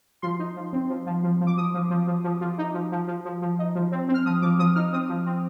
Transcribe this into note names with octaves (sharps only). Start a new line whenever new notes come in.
F3 C6
D#4
F3
C4
F3
F3
F3
F3
D6
F3 D#6
F3
F3
F3
F3
F3
D#4
F3
F3
F3
F3
F3
D#4
F3
C4
C4
F6
F3 D#6
F3 D6
F3 D#6
D#4 F6
C4 D#6
F3
C4